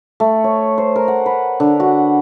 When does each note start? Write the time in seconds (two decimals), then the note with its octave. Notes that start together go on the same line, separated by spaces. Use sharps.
0.20 A3
0.44 C#5
0.78 C5
0.96 A#4
1.08 F#5
1.26 B4
1.60 D3
1.80 F#4